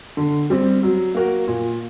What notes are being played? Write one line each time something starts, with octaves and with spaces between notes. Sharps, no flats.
D3
G3 C4
F#3
A#3 F#4 A#4
A#2